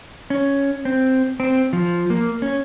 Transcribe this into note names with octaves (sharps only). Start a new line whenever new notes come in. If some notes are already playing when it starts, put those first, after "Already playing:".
C#4
C4
C4
F3
A#3
C#4